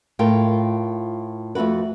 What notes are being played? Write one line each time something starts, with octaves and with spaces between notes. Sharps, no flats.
A2 F4 A#4 G5
F2 A3 E4 F#4 B4